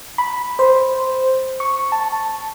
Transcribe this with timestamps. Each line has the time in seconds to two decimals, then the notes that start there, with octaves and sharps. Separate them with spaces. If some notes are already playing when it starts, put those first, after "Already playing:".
0.18 B5
0.59 C5
1.60 C#6
1.92 A5